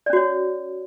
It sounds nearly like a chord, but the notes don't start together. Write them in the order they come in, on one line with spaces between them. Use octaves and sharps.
D5 C#4 F#4 C#5